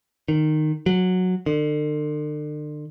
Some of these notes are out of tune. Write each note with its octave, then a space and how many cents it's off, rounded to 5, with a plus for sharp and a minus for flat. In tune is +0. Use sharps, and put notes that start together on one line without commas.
D#3 -15
F#3 -10
D3 +40